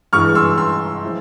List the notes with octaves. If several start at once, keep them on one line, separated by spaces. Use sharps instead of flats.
G2 E3 G#3 C#6 F6
C6 E6
C6 E6
F3 G#3 E4